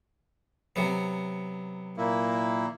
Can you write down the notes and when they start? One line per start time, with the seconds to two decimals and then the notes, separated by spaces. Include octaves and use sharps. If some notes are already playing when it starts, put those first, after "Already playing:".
0.76 C3 F#3 B3
1.97 A#2 A#3 E4